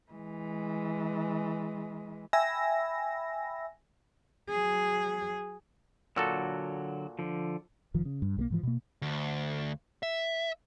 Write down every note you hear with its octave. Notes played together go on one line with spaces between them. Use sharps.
E3 G#3
E5 G5 G#5 B5 E6 A#6
F#3 G#4
A#2 D3 F#3 F#4 A4 E6
D3 F3
F1 D#3 F3
C#3
G2
B1 G3 A#3
G#2 E3 F3
B2 A#3
D2
E5